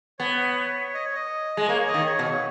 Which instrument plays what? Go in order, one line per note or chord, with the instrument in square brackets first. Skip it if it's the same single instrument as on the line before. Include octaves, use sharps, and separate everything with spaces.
[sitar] B3 [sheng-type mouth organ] C#5
[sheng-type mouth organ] D#5
C#5
D#5
[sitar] G#3
[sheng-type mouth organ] D#5
[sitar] A#3 [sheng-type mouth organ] C#5
[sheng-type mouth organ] D#5
[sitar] D#3
[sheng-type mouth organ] C#5
[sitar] B2
[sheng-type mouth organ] C#5